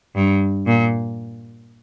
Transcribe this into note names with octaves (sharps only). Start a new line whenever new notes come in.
G2
A#2